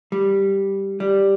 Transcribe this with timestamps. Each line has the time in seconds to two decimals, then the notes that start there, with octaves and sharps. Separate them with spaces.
0.12 G3
1.00 G3